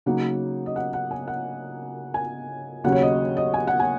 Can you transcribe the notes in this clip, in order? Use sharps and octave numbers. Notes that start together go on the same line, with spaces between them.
C#3 F#3 A#3 D#4 F#5
D#5
F#5
F#5
G#5
F#5
G#5
D#2 C#3 F#3 C#4 F#5
C#5
D#5
D#5
G#5
F#5
G#5